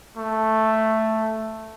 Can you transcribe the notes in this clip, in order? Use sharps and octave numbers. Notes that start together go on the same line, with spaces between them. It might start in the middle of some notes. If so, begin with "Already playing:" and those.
A3